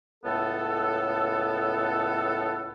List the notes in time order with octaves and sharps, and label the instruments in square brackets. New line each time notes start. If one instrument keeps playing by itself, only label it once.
[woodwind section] C#2 A2 B3 A4